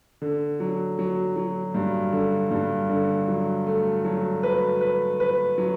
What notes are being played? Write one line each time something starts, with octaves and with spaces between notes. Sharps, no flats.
D3
F#3
F#3
F#3
G2
D3
G2
D3
F#3
A3
F#3
B4
B4
B4
F#3